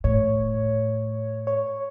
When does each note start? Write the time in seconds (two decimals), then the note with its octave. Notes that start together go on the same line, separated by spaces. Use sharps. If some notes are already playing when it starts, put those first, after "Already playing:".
0.04 A2 C#5
1.47 C#5